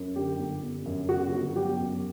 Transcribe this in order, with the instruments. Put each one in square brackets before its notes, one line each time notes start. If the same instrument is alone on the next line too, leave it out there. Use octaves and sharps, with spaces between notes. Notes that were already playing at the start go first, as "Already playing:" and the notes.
Already playing: [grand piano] F#2
D3 G4
G1
G1
F#2
C#3 F#4
G1
F#3 G4
F#2